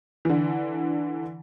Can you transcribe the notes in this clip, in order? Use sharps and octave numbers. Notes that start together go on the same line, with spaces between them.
D3 E3